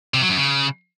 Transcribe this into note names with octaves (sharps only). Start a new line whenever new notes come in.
C3
F#3
F#2
C#3